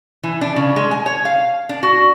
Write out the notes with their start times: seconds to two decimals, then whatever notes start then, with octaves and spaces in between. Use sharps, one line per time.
0.23 E3
0.41 D4
0.56 C#3
0.76 G#3
0.91 G#5
1.06 C#5
1.25 F5
1.69 D4
1.83 F#4